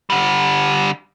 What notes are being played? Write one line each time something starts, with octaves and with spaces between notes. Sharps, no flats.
D3 G3